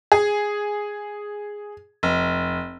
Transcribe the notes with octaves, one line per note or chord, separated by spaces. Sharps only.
G#4
F1